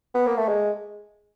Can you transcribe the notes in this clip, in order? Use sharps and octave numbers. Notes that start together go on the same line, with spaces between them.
B3
A#3
A3
G#3